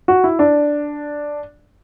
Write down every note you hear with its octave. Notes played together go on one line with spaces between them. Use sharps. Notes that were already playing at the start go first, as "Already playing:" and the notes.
F#4
E4
D4